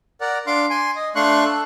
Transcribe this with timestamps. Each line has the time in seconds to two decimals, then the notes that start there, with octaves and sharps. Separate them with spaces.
0.21 A#4 D5 F#5
0.47 D4 F5 C6 D6
0.70 G#5 C6
0.96 D#5
1.16 A3 D4 F5 C6 C#6 F#6
1.45 A4